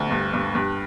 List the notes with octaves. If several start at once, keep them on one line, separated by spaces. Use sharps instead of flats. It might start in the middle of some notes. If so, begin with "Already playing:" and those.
Already playing: D2
G2
G2
G2